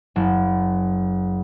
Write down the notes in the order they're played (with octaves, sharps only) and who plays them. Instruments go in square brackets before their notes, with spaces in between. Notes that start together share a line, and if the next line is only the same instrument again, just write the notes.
[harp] F#1